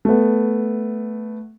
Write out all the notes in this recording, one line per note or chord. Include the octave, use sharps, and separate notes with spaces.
A3 B3